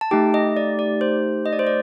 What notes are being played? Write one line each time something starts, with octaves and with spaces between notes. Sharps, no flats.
A5
A3 D#4 G4 G5
D#5
D5
D5
C5
D#5
D5
C5
D5